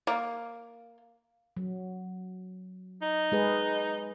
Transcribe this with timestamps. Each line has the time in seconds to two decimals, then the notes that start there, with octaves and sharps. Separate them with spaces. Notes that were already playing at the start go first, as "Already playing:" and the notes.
0.07 A#3
1.57 F#3
3.02 D#4
3.32 G#3 G#4 B4